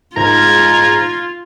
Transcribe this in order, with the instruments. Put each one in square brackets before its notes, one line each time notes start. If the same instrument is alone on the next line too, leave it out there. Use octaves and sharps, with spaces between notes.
[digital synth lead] G#2 [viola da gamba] F4 [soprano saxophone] A#5 [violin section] F6 G#6